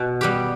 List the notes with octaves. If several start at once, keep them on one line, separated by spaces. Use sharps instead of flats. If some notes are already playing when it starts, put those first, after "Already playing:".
Already playing: B2
G3 B3 G4